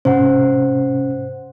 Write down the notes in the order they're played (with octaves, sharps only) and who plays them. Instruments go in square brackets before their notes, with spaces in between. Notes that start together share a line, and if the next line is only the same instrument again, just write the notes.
[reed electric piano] G#2 C3 C#4 [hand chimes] C5 F#5